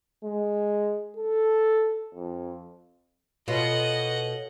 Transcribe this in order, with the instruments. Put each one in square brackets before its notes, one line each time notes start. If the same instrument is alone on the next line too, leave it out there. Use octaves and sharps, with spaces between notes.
[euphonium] G#3
A4
F2
[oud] B2 B3 F4 [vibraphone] A4 C#5 [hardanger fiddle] D#5 F#5